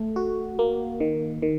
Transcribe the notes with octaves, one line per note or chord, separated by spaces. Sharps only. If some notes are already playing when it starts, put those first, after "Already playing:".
Already playing: A3
F#4
A#3
D#3
D#3